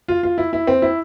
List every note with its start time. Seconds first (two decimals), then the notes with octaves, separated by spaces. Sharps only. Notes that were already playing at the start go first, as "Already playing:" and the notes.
0.08 F4
0.23 F4
0.38 E4
0.53 E4
0.67 C4
0.82 E4